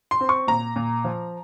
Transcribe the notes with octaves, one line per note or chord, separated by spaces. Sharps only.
C6
C4
C#6
A#2 A#5
A#2
F3